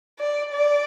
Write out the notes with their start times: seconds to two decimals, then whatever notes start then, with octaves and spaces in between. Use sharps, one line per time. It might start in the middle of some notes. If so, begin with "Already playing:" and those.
0.19 D5
0.52 D5